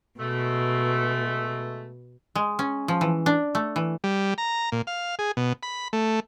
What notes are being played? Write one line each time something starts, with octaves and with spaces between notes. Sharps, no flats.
B2 G#3 A3
G#3
C#4
F3
E3
D4
A3
E3
G3
A#5
A#2
F5
G#4
B2
B5
A3